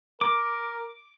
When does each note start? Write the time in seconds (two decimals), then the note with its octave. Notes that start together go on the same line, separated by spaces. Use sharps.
0.21 A#4 D6